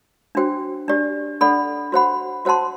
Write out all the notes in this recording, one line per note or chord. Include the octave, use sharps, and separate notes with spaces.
D4 F#4 C5 G5
D4 G4 D5
D4 A4 D5 F#5 B5
F#4 C5 F#5 B5
F#4 C5 F#5 A5 C6